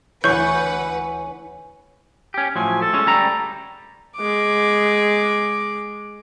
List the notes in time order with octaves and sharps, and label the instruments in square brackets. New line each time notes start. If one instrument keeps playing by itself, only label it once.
[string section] D2 B4 F#5 [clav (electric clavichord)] E3 [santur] C#5 G#5 [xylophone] C#6 G6
[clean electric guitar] C#4 G4
[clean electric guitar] A2 F3 F#3 [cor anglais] G#5
[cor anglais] A4
[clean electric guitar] G#3 C#4
D2 G3 A#5
[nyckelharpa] G#3 D6